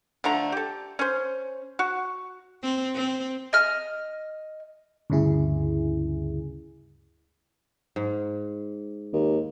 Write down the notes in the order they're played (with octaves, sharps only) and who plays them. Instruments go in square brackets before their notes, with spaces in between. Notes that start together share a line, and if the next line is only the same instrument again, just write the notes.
[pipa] D3 F3 A3 A#5
G4 A4
C#4 C5
F#4
[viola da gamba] C4
C4
[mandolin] D#5 F6
[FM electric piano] D2 G2 C#3 E4 G#4
[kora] G#2
[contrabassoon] D#2